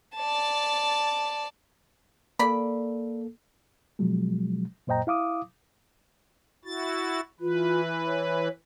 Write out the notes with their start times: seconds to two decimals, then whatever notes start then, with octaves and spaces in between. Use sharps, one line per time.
0.16 D5 A5
2.39 A#3 A4 D5 B5
3.99 B2 F3 F#3 G#3
4.87 F#2 A#2 C5 D#5 G5 A#5
5.07 E4 F5 D6 D#6
6.65 E4 F#4 A6
7.40 E3 F4 B4
8.06 C#5